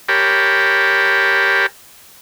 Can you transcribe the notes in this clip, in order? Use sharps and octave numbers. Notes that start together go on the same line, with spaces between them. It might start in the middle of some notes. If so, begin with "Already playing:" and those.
G4 A#4 C#5 G5 A5 B5